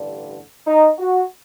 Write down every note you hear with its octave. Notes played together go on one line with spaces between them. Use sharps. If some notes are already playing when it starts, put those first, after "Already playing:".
Already playing: A1 G2 D3
D#4
F#4